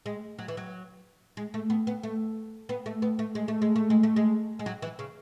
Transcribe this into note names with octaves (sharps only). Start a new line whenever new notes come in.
G#3
F#3
E3
F#3
G#3
A3
B3
B3
A3
B3
A3
B3
A3
G#3
A3
G#3
A3
G#3
A3
G#3
G#3
F#3
E3
C#3